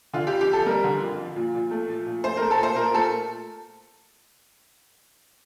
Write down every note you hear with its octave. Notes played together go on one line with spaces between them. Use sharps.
D3 F4
G4
F2
G4
F2 A4
G3 A#4
D3
F2
F3
A#2
A#2
A3
F3
A#2
A3 C5
A3 A#4
A4
A#2 C5
A#2 A#4
A3 A4